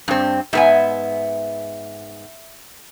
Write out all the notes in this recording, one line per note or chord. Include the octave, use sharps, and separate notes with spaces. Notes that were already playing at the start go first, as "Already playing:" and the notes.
G2 C4
G#2 B3 E5 G#5